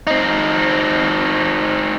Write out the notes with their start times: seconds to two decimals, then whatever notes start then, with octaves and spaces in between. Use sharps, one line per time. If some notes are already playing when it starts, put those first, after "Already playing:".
0.07 C4 D#4